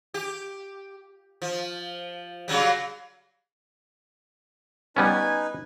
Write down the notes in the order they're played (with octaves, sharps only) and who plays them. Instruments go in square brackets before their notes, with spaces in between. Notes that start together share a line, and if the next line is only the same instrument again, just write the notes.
[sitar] G4
F3
C#3 F#3 G3
[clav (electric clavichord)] G3 B3 C#4 [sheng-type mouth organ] D#4 B4 [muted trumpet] G#5